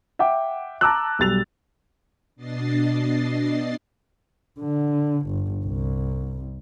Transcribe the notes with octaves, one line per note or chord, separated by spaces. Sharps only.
E5 F#5 G5 D6
A5 A#5 D6 E6 F#6
B1 G3 A6 F7
B2 D4 D#5 A6 C7
D3
G1
C2